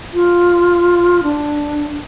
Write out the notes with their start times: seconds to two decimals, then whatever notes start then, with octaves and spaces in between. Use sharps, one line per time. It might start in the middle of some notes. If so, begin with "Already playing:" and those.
0.14 F4
1.23 D4